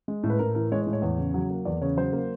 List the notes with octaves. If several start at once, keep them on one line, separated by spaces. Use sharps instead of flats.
G#3
A2
B4
A2 A#4
E3 A#4
G#3 C#5
C#5
A2
C#5
E2
C#3
F#3
A#3
E2 D5
C#3 C#5
F#3 C5
A#3